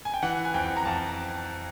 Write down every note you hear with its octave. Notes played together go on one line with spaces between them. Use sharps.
G#5
G5
E3 F#5
G#5
F2 G5
A#5
F2 A5